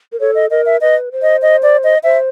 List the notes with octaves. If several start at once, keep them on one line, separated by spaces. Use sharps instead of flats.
A#4
A4 C#5
D#5
A#4 D#5
E5
B4 D#5
C5
D#5
D#5
D5
D#5
C5 E5